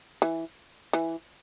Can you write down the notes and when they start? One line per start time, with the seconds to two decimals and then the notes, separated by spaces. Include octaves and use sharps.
0.22 E3
0.93 E3